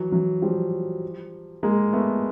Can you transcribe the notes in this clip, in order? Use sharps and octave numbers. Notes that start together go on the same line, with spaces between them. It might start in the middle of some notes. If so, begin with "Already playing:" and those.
Already playing: E3 F#3
E3 F#3
F3 G3
G#3 A#3
A3 B3